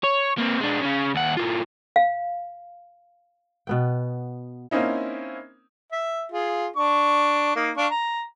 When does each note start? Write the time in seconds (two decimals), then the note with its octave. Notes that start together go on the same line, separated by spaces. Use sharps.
0.04 C#5
0.38 A#3 C4
0.60 G#3 D4
0.80 C#3 C#4
1.15 D#2 F#5
1.37 A2 F4
1.96 F5
3.67 B2 B3 G5
4.71 A#3 C4 C#4 D#4 E4
5.92 E5
6.32 F4 G#4
6.76 D4 C#6
7.56 A#3 D#4
7.77 D4 F5 C#6
7.91 A#5